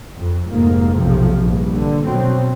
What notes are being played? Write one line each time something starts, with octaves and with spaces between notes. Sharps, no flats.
F2
F1 G#2 A#3
B1 C3 F3
A#1 G2
D3
B2 F#3 C4